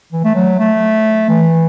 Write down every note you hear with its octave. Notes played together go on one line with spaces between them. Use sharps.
E3
A3
F#3
A3
E3